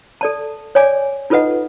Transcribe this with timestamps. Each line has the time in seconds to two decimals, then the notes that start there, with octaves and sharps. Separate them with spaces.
0.21 A4 D5 A5
0.75 C#5 D5 G#5 D6
1.30 D#4 F4 A4 B4 D#5 F#5